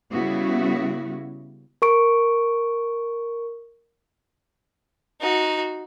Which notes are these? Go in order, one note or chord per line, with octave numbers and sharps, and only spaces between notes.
C#3 G3 B3 E4 F#4
A#4 C#6 D7
D#4 F#4